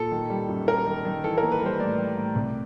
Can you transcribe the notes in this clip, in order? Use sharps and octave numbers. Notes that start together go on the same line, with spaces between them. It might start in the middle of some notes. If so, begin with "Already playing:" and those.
Already playing: A#2 A4
D#3
G3
F#2
F#2 A#4
D#3
D#3
E3 A4
A#3 A#4
B4
G3 C5
A2 D5
G3
A2
C2